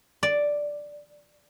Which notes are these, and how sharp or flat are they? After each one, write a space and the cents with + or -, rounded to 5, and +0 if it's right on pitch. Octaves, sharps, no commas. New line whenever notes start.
D5 +0